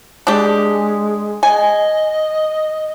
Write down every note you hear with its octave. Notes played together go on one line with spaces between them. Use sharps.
G#3 D4 G4
D#5 G#5